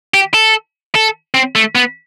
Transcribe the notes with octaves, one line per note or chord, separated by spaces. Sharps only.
G4
A4
A4
C4
A3
B3